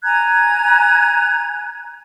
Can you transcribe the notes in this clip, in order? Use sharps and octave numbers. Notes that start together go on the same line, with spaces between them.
G#5 A#5 F#6 G#6